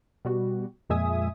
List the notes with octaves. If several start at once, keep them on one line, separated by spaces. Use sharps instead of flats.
B2 G3 F#4
F2 A#2 G#3 E5 G#5 D#6